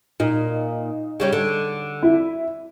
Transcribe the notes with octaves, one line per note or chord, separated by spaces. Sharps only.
A#2 D#4
C#3 G3 C#4
D3
E4